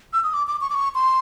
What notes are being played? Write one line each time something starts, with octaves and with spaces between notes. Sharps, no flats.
E6
D#6
D6
D6
C#6
D6
C#6
C6